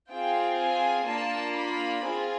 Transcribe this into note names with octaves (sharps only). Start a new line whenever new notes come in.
C4 F4 G#4 G5
G#5
A#3 D4 F4 A5
B5
C4 F4 G#4